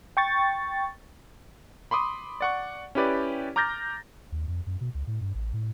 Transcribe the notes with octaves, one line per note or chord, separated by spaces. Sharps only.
G5 C#6 A6
B5 C6 D6 D#6
D5 F#5 C#6
C#4 E4 G4 B4 D5
A#5 D6 F6 G6 A6 A#6
D#2
F2
F#2
B2
C#2
A2
G2
A1
A2